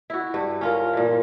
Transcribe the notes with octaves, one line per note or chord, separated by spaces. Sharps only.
E4 F#4
G2
C#4 F4 A#4
A#2 E3